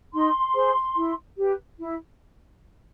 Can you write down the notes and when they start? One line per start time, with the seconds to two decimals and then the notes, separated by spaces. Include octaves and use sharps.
0.14 D#4 C6
0.55 G#4 C5
0.96 E4
1.37 G4 B4
1.79 E4